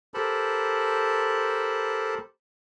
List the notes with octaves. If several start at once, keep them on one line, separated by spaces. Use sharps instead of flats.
G4 A4 A#4 C5 A5 B5